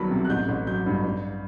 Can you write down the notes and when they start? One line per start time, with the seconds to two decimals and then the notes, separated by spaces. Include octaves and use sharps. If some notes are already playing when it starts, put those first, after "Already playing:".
Already playing: C2 D#3 F#3 B3 A5 B5
0.11 C3
0.25 F#6
0.30 A1 G6
0.48 A1
0.67 F#3 G6
0.86 G2
1.04 G2